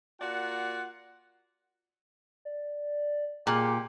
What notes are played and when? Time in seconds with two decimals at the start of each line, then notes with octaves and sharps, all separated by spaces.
0.21 A#3 F4 F#4 D5 F#5
2.45 D5
3.47 A#2 G4 G#4